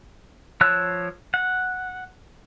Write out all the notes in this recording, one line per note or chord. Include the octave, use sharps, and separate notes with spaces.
F3 C#5 A5 E6 F#6
F#5